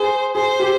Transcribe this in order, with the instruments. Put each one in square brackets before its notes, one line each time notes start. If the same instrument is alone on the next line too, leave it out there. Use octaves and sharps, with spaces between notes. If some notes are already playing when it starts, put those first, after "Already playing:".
Already playing: [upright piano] G#4 [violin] C5
[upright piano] G#4 [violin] C5
[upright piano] G4